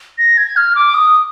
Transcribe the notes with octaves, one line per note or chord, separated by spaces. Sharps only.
A#6
G#6
F6
D6
D#6